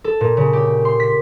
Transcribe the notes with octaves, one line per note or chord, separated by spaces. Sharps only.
A4
A#2
C#3
G4
C6
B6